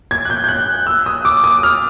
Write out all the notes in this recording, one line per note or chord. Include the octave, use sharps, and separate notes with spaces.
G#6
F#6
G6
G6
F#6
E6
D#6
D6
D#6
F6